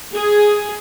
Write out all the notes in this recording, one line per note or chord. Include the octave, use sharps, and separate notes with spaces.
G#4